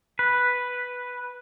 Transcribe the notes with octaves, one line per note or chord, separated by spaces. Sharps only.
B4